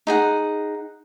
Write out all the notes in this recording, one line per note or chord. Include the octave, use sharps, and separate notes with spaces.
D#4 G#4 F#5